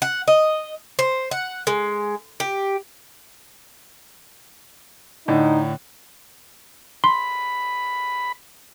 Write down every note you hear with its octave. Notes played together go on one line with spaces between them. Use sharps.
F#5
D#5
C5
F#5
G#3
G4
A2 D3 D#4
B5 C6